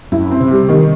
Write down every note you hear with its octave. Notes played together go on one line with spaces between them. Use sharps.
F#2 E4
C4
C3
G3
C3 D#3